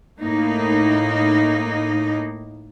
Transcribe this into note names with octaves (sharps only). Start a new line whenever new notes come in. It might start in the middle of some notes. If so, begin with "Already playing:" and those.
A2 A#3 D#4